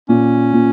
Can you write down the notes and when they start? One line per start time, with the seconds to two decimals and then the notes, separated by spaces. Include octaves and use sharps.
0.09 A#2 C#4
0.53 A#2